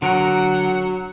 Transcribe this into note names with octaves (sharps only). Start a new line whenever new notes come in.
D3 F#3 A#4 F#5